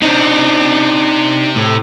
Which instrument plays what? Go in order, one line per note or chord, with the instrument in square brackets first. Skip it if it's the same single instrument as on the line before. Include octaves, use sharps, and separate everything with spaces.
[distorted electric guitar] C3 C4 [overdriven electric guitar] D4 D#4
[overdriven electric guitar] A2